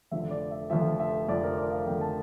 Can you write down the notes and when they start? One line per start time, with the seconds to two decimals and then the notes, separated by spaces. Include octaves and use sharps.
0.11 F1 F2 D3 F3 E5
0.31 D5
0.51 E5
0.70 F1 F2 D3 F3 E5
1.00 E5
1.29 F1 F2 D3 F3 D5
1.44 A#4
1.58 D5
1.72 F5
1.86 F1 F2 D3 F3 G5
2.01 A5